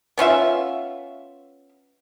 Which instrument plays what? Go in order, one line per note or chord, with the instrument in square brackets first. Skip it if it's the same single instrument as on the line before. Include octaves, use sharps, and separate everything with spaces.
[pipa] B3 C#4 F4 E5